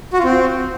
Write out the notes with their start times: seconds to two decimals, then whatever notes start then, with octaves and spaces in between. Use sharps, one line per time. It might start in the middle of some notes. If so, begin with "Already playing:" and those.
0.13 F#4
0.19 F4
0.24 C4